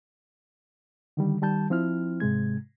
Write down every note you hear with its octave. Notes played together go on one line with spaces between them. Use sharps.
D3 D#3 G3
D#3 G3 A5 G6
F3 C4 E4 F6
G#2 C3 G#3 G#6